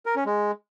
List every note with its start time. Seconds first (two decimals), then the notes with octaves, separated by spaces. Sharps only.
0.06 A#4
0.16 C#4
0.26 G#3